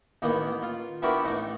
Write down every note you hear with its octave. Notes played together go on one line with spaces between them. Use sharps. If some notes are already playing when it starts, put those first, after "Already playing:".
A1 D#3 A#3 B3 D#5
F4
B3 D4 E4 F#4 G4 A#4
A1 A3 D#4 D#5